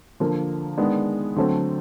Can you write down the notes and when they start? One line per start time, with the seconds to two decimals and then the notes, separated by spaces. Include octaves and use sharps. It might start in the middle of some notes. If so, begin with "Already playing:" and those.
0.20 D3 F3 A#3
0.78 D#3 G#3 B3 D4
1.36 D3 F#3 A3 C4